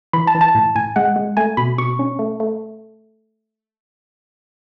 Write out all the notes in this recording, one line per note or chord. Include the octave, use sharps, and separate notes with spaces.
E3 B5
A5
E3
A5
A2
A2 G#5
G#3 F#5
G#3
A3 G#5
B2 B5
B2 C#6
C#4
A3
A3